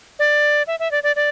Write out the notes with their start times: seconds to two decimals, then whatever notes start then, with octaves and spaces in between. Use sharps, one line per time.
0.19 D5
0.67 E5
0.79 E5
0.91 D5
1.03 D5
1.16 D5